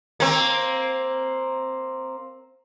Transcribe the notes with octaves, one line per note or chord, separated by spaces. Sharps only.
A#3 C4